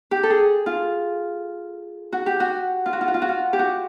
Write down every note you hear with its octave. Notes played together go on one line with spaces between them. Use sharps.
G4
A4
G#4
F4
F#4
G4
F#4
F4
F#4
F4
F#4
F4
F#4
F4
G4
F#4